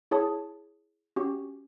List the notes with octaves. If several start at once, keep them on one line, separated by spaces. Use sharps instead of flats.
E4 G#4 C#5 A5 D#6
C#4 F#4 G4